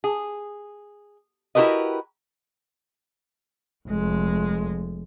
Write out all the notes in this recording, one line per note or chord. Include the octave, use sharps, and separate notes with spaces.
G#4
E4 F#4 G4 A#4 B4 D#5
F1 G#3